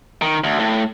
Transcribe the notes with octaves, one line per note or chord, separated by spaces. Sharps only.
D#3
D2
A2